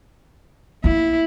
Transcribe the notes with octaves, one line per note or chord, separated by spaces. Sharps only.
A#3 B3 E4